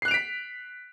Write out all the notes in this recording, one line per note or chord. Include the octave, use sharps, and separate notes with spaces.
F#6 B6 C7 D7 F7